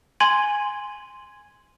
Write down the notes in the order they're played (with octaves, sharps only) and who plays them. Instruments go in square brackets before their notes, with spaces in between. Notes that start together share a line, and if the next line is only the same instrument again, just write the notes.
[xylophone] G#5 C6 G#6 D#7 F#7